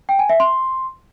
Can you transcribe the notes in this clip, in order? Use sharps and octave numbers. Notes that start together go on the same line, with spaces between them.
G5
G#5
E5
C6